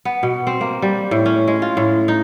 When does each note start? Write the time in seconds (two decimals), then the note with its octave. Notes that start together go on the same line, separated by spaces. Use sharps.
0.05 B3
0.23 B2
0.47 C4
0.61 A#3
0.82 G3
1.11 A2
1.26 C#4
1.48 G#3
1.62 F4
1.77 A2
2.08 D#4